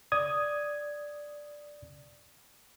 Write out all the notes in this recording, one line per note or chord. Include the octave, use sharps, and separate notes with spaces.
D5 D#6 G#6